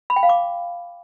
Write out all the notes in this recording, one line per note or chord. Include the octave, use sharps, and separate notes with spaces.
B5
G5
F5
D6